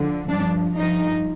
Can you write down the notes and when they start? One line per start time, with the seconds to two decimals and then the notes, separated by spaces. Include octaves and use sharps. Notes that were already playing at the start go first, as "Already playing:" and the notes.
Already playing: D3 F3
0.28 G2 F3 D4
0.76 G2 F3 D#4